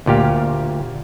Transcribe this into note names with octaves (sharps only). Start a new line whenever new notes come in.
D2 A#2 G4 F5